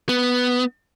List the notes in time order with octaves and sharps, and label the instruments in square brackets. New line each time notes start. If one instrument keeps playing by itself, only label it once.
[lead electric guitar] B3